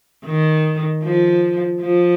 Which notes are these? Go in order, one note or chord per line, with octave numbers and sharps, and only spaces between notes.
D#3
F3
F3